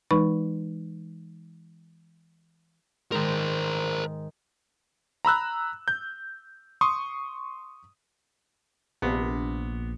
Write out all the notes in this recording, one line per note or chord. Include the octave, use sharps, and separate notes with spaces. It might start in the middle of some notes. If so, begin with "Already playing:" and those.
E3 G#3 D#4 B4 B5 C#6
G#2 D#3 A#4 C5
A#5 B5 E6 F#6
G6
C6 C#6 D#6
A#1 C3 B3